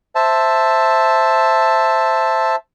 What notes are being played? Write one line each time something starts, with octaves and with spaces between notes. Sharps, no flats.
C5 E5 A5